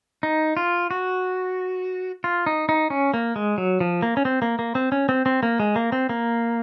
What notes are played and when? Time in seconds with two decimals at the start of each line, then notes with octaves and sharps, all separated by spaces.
0.23 D#4
0.57 F4
0.91 F#4
2.24 F4
2.46 D#4
2.69 D#4
2.90 C#4
3.14 A#3
3.36 G#3
3.58 F#3
3.80 F3
4.02 A#3
4.17 C#4
4.25 C4
4.42 A#3
4.59 A#3
4.75 C4
4.92 C#4
5.09 C4
5.26 C4
5.43 A#3
5.60 G#3
5.76 A#3
5.92 C4
6.09 A#3